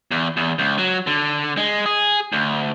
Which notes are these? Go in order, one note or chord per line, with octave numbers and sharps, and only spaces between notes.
E2
E2
C#2
F#3
D3
G#3
G#4
D2